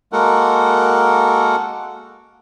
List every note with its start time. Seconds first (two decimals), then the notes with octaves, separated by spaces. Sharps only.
0.12 G#3 A#3 F#4 A4 A#4 F#5